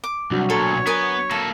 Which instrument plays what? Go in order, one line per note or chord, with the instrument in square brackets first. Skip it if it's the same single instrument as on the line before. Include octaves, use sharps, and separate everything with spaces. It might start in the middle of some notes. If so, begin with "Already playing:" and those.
[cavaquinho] D6
[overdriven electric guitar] C2 [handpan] F#3 D4 F#4
[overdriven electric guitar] B1 A#2 [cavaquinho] A4 [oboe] C#5
[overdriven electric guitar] B3 [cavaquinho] A#4 G#5 D#6
[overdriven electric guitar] A#3 A4 [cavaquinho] A5